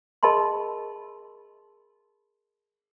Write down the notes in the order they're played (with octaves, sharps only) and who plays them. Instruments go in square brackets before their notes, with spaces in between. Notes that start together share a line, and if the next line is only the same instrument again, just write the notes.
[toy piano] G#4 A#4 D#5 A5 B5 C6